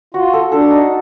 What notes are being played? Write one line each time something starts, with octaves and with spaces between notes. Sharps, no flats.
F4 F#4
A4
D4 A4
D#4